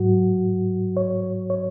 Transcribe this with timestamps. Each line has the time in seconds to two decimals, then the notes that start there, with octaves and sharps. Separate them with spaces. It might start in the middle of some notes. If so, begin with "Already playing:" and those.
Already playing: G#2 F#3 F#4
0.97 C#5
1.50 C#5